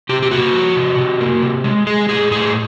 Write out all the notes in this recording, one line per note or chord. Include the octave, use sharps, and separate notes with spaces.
C3 G4
G4
A#3 F#4
F3
C3
C3
A#3
C3
G#3
G#3 G#4
A2 G#4
A2 G#4